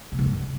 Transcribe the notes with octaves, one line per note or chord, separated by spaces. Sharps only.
C3
D3
G2